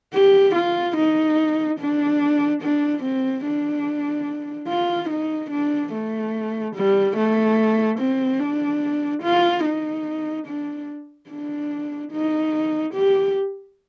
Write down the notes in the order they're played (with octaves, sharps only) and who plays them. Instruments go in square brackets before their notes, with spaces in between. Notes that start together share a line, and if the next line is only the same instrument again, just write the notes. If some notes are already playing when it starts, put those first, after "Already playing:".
[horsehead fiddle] G4
F4
D#4
D4
D4
C4
D4
F4
D#4
D4
A3
G3
A3
C4
D4
F4
D#4
D4
D4
D#4
G4